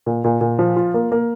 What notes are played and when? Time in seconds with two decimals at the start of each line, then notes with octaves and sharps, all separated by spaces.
0.06 A#2
0.24 A#2
0.41 A#2
0.59 F3
0.76 F4
0.94 A#3
1.12 A#3